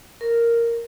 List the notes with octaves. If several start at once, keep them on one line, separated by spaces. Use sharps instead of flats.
A#4